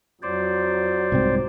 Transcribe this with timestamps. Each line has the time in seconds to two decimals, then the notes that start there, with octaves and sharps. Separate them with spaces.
0.23 F2 F#3 C5 D5
1.12 C2 G#2 C4